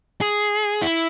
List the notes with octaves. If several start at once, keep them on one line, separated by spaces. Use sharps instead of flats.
G#4
E4